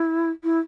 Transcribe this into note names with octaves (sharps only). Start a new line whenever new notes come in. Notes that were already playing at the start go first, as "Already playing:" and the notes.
Already playing: E4
E4